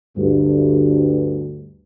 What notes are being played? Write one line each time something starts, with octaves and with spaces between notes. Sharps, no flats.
D2 G2